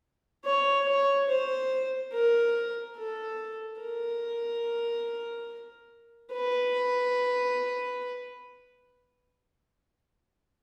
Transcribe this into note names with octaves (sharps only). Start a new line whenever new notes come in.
C#5
C#5
C5
A#4
A4
A#4
B4